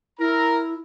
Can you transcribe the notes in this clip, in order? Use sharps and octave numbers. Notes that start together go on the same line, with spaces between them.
E4 A#4 A#5